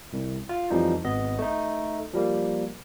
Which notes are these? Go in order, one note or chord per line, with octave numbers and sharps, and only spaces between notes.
C2
F4
F2 E3 F3 G3 D#4
G#1 B3 D#5
A3 D#4
F3 G3 A#3